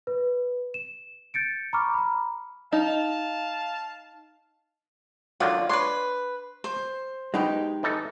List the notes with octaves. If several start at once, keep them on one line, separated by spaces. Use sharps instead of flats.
B4
E7
G6 A6 C#7 D7
A#5 B5 C#6 D6 F6
A#5 B5
D#4 F5 A5
D3 D#3 F#3 F4 D5
D4 B4 C#5 C6
C5
B2 G#3 D#4 G4
E3 D#4 A4